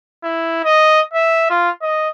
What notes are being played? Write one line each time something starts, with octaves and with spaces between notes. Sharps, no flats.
E4
D#5
E5
F4
D#5